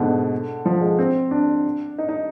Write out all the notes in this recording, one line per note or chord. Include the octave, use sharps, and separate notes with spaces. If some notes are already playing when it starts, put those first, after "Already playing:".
Already playing: G#2 B2 D3
F3
G#3
C4
D4
D#4
D#4